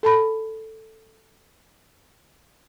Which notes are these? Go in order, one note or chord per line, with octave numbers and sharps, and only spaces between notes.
A4 A5 B5